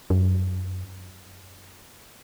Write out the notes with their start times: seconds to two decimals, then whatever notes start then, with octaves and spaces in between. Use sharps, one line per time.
0.10 F#2